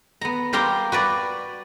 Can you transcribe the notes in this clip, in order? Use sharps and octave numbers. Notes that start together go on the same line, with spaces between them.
B3 A#5
G3 G4 A#4 F5 A#5 C6
F#4 B4 D5